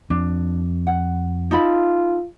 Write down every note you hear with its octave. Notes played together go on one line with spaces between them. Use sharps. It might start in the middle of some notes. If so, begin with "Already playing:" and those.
F2 D4
F#5
D#4 F4 A4 B5